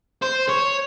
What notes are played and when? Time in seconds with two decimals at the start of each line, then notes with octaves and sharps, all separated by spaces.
0.22 C5
0.49 C#5